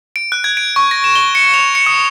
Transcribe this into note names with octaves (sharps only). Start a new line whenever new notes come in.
D7
F#6
G#6
D7
C#6
A#6
E7
G7
C#7
F7
C#7
D#6